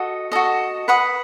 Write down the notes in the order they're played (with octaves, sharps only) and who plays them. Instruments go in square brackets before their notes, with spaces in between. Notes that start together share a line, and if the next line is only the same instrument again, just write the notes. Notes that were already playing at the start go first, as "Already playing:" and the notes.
Already playing: [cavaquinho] F#4 A4 D#5
F#4 A4 D#5
B4 F#5 B5 D#6